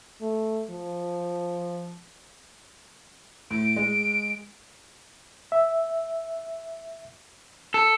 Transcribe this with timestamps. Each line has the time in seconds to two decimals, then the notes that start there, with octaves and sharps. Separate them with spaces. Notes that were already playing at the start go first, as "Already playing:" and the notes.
0.21 A3
0.70 F3
3.51 A2 D7
3.76 G#3
5.52 E5
7.74 A4